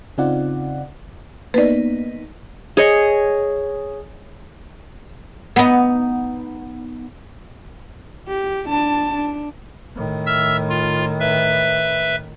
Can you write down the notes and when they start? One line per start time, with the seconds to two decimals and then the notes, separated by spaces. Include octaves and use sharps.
0.18 C#3 C4 D#4 F4 D5 F#5
1.54 A#3 B3 D#4 B4 D5
2.77 G#4 C#5 D#5
5.56 B3 D#4
8.28 G4
8.69 D4 A5
9.15 D4
9.96 A2 D#3
10.26 E5 E6 F6
10.70 F4
11.20 B4 E5